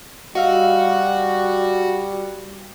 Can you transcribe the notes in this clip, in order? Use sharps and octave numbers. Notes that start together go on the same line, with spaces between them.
G3 F#4 D#5 F5 E6